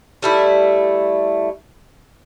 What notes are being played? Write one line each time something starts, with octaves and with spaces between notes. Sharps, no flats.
G3 A3 E4